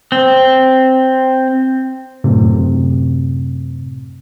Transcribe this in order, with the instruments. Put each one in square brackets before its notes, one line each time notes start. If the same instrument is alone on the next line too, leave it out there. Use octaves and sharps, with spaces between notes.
[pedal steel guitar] C4
[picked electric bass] F#2 A2 C3